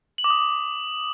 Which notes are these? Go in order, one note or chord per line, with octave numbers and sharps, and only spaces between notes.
F#7
D6
D#6